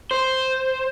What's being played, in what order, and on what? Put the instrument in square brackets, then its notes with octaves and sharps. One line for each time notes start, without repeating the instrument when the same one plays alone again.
[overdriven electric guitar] C5